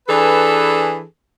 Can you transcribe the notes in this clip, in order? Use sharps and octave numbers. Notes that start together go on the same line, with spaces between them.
E3 D4 G#4 A4 B4